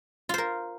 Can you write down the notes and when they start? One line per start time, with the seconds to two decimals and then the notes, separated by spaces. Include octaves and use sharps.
0.29 F4
0.34 C5
0.38 A#4